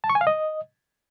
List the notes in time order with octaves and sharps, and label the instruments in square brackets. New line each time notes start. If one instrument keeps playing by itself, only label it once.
[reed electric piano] A5
C#6
G#5
F5
D#5